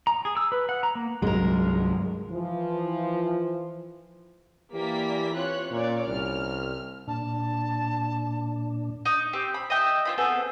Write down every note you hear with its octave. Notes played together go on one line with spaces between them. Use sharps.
A#5
G#4
E6
B4
F#5
A#5
A#3
C2 G2 F#3 G#3 A#4
E3 F3
E3 A#3 G4 D5 B6
C4 F4 C#5 F#6
A#2 C#4 C#5 D5
C2 F6
A#2 D4 A5
D#4
C4 G4
B5
D#5 E5 G5
C4 F4 B5
B3 C4 G#4 A4